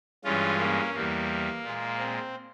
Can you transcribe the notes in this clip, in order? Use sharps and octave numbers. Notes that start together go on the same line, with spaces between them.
G2 E3 G#3 C#4 F4
A#3 C#4
E2 E3 G3 A#3
A#2 G#3
C4